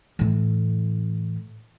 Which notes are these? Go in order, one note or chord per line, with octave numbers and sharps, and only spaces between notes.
A2 E3